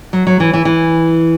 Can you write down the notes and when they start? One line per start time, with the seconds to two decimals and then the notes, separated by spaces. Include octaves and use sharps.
0.13 F#3
0.27 F#3
0.40 E3
0.53 E3
0.65 E3